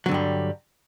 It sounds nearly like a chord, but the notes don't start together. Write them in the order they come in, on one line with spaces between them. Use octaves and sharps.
F#3 D3 G2 G3